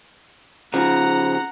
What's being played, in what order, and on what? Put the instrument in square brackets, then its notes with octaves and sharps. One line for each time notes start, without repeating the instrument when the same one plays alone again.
[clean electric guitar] C#3 F3 [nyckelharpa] F#5 A#5